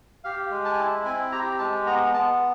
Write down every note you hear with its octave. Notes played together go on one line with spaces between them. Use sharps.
G4 F5
G#3
A5
G#5
E4 A5
C4 G#5
G4 A#5
G#3 A5
B3 A#5
B3 A5